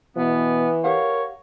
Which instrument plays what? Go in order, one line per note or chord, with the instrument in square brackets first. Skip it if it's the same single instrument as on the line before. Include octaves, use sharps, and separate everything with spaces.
[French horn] B2 [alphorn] E3 [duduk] B3
[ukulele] G4 F5 F#5 [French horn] A#4 [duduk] C#5